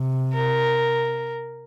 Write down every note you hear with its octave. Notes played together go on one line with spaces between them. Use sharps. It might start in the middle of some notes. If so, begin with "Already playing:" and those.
Already playing: C3
A#4